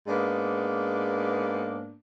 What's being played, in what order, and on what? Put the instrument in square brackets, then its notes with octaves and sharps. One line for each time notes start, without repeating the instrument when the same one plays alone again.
[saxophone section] G#2 A#3 B3 D4